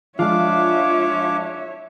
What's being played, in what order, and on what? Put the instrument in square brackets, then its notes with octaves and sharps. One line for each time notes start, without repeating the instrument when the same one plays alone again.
[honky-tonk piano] F3 G#3 F5 [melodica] D4 D6 [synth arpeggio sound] F4 [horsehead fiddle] C#5 E5